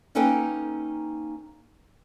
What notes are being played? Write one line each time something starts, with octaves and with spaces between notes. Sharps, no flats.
A#3 C#4 D#4 A4 B4 G5